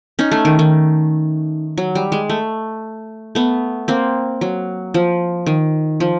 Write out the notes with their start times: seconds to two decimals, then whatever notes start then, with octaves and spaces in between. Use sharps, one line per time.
0.19 C#4 D#4
0.31 A3
0.45 D#3
0.59 D#3
1.78 F#3
1.95 G3
2.12 G#3
2.29 A3
3.35 A3 B3
3.88 A#3 C4
4.41 F#3
4.94 F3
5.46 D#3
6.00 F3